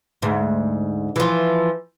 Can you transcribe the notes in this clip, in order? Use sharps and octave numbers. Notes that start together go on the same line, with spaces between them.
D2 G#2
E3 F3